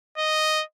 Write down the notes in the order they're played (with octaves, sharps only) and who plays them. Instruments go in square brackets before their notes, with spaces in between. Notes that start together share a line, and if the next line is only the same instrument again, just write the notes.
[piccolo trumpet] D#5